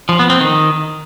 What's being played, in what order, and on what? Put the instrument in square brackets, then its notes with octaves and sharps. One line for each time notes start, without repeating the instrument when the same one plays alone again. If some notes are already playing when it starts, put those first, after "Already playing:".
[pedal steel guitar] F3
B3
C4
D#3